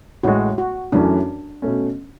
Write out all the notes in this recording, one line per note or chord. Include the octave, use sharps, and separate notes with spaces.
A1 A2 G#3 F#4
F#4
F#2 E3 A3 C#4 D4 F#4
B2 A3 C#4